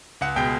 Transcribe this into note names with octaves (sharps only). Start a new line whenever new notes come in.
C#2 F#5
B2 G#3 G5